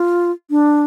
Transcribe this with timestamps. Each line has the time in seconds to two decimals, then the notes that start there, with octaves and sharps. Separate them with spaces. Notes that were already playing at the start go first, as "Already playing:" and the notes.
Already playing: F4
0.51 D4